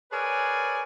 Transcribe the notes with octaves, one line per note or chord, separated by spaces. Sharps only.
G#4 A#4 B4 C#5 D5 G#5